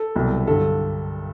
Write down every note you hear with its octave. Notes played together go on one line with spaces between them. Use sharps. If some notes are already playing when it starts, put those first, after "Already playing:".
Already playing: A4
C2 B2 F#3
G2 D3 F#3 A4